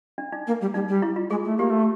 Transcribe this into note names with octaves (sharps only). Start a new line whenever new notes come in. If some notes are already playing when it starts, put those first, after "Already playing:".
D4
D#4
A#3
G3
G3 D#4
G3
E4
F4
G#3 G#4
A3
A#3 G4
A3